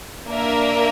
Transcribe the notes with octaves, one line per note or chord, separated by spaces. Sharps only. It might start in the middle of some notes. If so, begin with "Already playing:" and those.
A#3 D4 A#4 E5